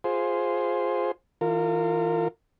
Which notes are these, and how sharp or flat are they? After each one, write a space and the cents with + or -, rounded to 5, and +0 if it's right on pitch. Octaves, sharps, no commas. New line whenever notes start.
F4 +10 G#4 +0 C5 +0
E3 -25 F4 +0 A#4 -35